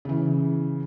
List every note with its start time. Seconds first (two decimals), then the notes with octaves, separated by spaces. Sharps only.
0.05 C#3 E3